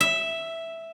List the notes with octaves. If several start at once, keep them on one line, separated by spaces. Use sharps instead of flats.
E5